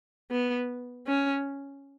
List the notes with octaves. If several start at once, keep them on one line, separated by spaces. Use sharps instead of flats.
B3
C#4